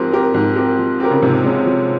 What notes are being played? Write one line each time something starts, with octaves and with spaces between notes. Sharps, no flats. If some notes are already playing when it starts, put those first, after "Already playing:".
Already playing: G#2 F3 C4 G4 A#4
C4 G4 A#4
G#2 F3
C4 G4 A#4
F3
C4 G4 A#4
C#3
G#2 C3 F3
G#3 C#4 F4
F3